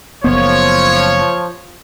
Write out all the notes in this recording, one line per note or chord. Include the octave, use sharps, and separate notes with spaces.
F#1 F3 B3 C#5